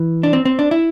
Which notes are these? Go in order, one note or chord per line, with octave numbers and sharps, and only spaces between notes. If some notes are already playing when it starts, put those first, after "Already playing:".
Already playing: E3
D4
C4
C4
D4
E4